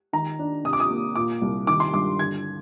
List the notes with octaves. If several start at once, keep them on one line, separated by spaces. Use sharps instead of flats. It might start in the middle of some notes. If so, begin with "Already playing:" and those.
D#3 A#5
D4
C3 D#6
D6
D#6
A#3
A#2 D6
C2
D#3 D6
C6
G2 D6
D3 G#6